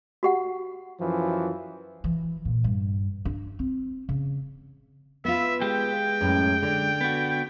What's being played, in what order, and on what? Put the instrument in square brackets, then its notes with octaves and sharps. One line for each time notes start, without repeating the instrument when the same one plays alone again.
[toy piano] F#4 G4 F#5
[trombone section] F#2 E3 F3
[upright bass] E3
A#2
G2
D4
C4
C#3
[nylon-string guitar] B3 F4 [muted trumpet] E5
[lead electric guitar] G#3 G4 [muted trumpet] G5
[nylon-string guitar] F#2 A2
D3
[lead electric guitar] B3 F#4